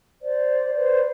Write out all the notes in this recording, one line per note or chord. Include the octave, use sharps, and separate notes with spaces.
C5 D5
B4 C5 D5